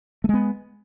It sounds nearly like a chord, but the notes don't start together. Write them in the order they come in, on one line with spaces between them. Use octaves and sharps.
A3 G#3 B3